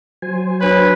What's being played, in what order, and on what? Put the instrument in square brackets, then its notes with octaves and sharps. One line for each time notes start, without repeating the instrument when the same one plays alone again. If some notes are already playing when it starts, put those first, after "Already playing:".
[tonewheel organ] F#3 C5 G#5
[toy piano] D4 C#5 [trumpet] B4